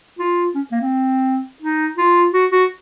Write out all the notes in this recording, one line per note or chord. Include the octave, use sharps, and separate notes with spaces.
F4
C#4
A#3
C4
D#4
F4
F#4
F#4